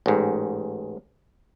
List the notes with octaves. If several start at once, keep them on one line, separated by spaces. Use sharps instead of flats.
A1 G#2